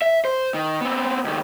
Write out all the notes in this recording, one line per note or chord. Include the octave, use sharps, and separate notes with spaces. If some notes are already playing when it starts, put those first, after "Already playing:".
E5
C5
D#3
B3 C4
C#2 D#3